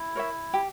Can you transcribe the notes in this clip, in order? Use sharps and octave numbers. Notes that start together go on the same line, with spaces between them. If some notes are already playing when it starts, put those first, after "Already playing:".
Already playing: E4
A#4 C#5 E5
G4